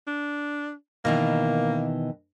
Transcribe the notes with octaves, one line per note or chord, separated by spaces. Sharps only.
D4
B2 D#3 E3 A#3